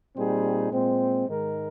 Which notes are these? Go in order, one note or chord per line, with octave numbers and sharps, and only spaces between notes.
A#2 G3 C4 D#4 G#4
A#2 G#3 C4
G#2 D#3 G#3 D#4 A#4